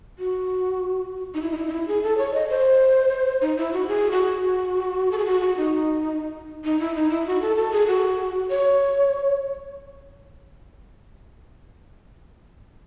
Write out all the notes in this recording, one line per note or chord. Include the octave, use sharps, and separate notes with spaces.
F#4
D#4
E4
D#4
E4
D#4
E4
G#4
A4
C#5
D#5
C5
D#4
E4
F#4
G#4
F#4
A4
G#4
F#4
F#4
D#4
D#4
E4
D#4
E4
F#4
A4
A4
G#4
F#4
C#5